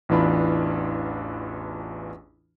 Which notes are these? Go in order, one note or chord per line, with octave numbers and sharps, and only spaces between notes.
A1 E2 E3 D4 F4 B5